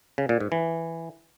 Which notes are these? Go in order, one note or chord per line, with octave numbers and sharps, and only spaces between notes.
C#3
A#2
G#2
E3